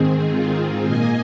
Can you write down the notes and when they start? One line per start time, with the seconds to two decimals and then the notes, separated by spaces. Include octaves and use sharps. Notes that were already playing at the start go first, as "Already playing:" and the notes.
Already playing: G#2 D#3 C4 G#4
0.30 F4
0.85 A#2 A#3 D#5 G#5